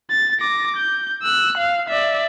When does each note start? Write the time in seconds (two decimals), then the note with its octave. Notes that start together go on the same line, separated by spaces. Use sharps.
0.11 A6
0.40 D6 A#6
0.77 G6
1.23 E6 F#6
1.58 F5
1.89 D5 E5